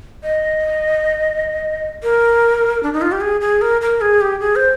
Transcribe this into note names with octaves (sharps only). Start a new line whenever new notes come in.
D#5
A#4
D4
D#4
F4
G4
G#4
G#4
A#4
A#4
G#4
G4
G#4
C5